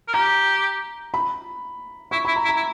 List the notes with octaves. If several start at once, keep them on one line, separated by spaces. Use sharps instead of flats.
A#4
G4 A#5
B5
E4 C#6
E4 B5
A#5
E4
A#5
E4